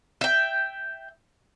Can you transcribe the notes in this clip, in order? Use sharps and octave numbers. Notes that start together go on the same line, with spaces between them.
E5 G5